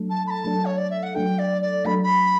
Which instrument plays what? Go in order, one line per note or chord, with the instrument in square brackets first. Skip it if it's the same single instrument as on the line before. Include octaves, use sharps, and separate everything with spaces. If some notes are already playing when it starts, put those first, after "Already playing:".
Already playing: [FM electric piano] F#3 A3 D4 A4
[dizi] A5
B5
A5
[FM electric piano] F#3 A3 D4 A4
[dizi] C#5
D5
E5
F#5
[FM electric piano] F#3 A3 D4 A4 [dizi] G5
[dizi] D5
D5
[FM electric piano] F#3 A3 D4 A4 [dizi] B5
[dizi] B5